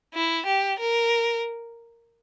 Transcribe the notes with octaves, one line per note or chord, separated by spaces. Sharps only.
E4
G4
A#4